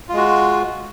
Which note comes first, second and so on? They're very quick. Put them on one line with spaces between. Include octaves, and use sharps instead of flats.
F4 G#3 F#4